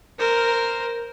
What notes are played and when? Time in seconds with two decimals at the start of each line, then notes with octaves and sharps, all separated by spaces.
0.19 A#4 C5